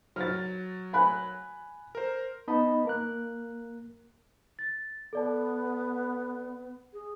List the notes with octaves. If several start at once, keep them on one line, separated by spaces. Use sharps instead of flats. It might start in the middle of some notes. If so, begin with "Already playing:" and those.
F#3 F6 A6
G#5 B5 F#6
A#4 C5
B3 D#4 D#5 A5 B5
A#3 A#4 F#6
A6
B3 A4 D5 A5
G#4